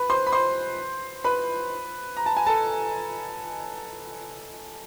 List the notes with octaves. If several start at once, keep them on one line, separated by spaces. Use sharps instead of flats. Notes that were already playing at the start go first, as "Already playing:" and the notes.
Already playing: B4 B5
C5 C6
B5
C5 C6
B4 B5
A#5
A5
G#5
A4 A5